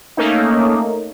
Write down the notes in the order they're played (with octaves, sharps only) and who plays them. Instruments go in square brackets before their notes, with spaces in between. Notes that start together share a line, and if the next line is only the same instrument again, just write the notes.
[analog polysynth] A3 A#3 C#4 D#4